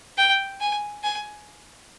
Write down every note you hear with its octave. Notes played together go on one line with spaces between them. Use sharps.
G5
G#5
G#5